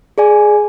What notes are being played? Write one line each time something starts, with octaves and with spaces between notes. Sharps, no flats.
G#4 D5 G#5